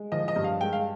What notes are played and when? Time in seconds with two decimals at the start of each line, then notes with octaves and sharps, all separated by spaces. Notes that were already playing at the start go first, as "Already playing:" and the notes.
Already playing: G#3
0.12 F3 D#5
0.28 D#5
0.36 G2
0.44 F5
0.61 G#3 G5
0.73 F5